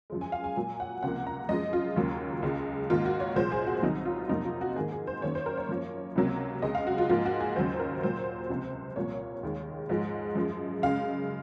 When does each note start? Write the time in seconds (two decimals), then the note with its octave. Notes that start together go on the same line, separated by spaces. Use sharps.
0.10 F#2 F3 G#3
0.21 G#5
0.32 F5
0.44 G#5
0.56 A#2 F#3 A#3 G#5
0.80 F#5
1.03 C#2 C3 F3 A#3 F#5
1.27 A#5
1.49 F#2 F3 G#3 D#5
1.73 F4
1.96 D#2 C#3 F#3 A#3
2.42 C#2 C#3 G#3
2.90 G#2 D#3 A#3 F4
3.05 F#4
3.20 C#5
3.36 C2 A#2 F3 G#3 C5
3.52 G#4
3.67 F#4
3.82 C2 C3 D#3 F#3 D#4
4.05 F4
4.29 F2 C3 F#3 A#3 D#4
4.45 F4
4.61 F#4
4.76 G#2 D#3 A#3 G#4
4.92 G#4
5.07 C5
5.22 F#2 D#3 A#3 C#5
5.35 C5
5.46 A#4
5.57 C#5
5.69 F#2 F3 A#3
6.16 C#2 C3 F#3 A#3
6.62 C#2 C#3 G#3 D#5
6.75 F5
6.87 F#4
6.98 F4
7.09 G#2 F3 A#3 F4
7.25 F#4
7.40 G#4
7.56 D#2 C#3 F#3 C5
7.79 A#4
8.02 A#2 F#3 A#3 C5
8.49 C#2 C3 F3
8.96 C2 A#2 F3 A#3 C#5
9.43 D#2 D#3 G#3
9.89 G#2 F3 G#3
10.35 F#2 F3 G#3
10.82 F#2 C#3 G#3 F5